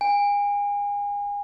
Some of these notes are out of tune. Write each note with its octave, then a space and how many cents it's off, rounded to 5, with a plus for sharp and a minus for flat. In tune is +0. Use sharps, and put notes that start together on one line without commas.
G#5 -35